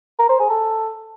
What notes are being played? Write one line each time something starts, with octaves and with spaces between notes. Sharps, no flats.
A#4
C5
G#4
A4